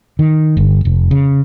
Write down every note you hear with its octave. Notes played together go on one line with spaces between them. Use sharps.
D#3
G1
F1
C#3